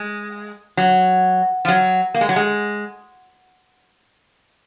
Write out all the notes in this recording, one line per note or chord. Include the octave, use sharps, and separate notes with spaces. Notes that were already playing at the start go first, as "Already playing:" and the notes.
Already playing: G#3
F#3
F3
F#3
A#3
G#3
F#3
G#3